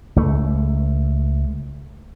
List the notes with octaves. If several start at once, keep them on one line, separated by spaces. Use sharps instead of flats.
C#2 A3